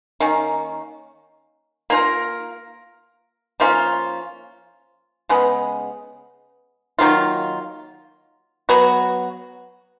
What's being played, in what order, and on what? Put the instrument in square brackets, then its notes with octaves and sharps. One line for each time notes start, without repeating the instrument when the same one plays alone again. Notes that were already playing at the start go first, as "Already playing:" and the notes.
[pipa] D#3 A#3 C#4
A#3 F4 A#4
F3 A#3 C#4 F4
C#3 G#3 B3
D#3 F#3 A#3 F4
F#3 B3 F#4